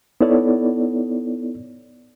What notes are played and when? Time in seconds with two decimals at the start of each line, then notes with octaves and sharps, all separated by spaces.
0.21 B3 D#4 E4 A4 C#5 D5